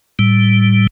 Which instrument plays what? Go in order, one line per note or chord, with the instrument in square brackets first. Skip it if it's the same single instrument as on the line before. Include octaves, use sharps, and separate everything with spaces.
[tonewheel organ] A2 G3